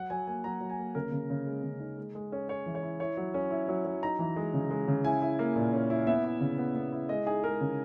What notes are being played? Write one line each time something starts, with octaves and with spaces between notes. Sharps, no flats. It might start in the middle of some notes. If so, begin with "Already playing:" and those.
Already playing: F#3 F#5
F#3 G#5
A#3 G#5
F#3 A#5
F#3
G#5
A#3
C#3 A#4
C#3
C#3
G#3
C#3
D#4
G#3
G#3
C#4
C#4 C#5
E3
C#5
E4
E4 C#5
F#3
C#4
E4
F#3
F#3
D#4 A#5
E3
G#3
C#3
G#3
C#3
E4 G#5
E4
A#3
A#2
C#4
E4
B3 E5
E4
C#3
B3
B3
E4
G#3 D#5
D#4 G#4
G#3 A#4
C#3